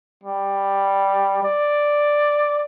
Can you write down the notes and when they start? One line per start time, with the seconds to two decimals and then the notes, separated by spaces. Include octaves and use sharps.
0.23 G3
1.43 D5